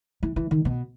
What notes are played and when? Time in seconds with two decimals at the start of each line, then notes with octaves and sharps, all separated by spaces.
0.23 E3
0.36 E3
0.51 D#3
0.65 B2